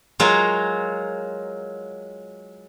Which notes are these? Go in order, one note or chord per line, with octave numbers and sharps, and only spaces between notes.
F#3 G#3 F4 A#4